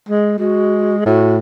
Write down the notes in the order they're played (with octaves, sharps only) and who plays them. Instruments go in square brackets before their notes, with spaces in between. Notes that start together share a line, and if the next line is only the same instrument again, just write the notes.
[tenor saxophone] G#3
[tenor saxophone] G#3 [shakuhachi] F#4
[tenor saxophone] A2 [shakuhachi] F#4